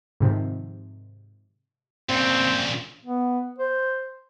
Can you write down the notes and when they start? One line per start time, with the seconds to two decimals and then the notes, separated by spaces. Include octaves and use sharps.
0.20 G#2 C3 D#3 F3
2.09 A#2 C#3 C4
3.05 B3
3.59 C5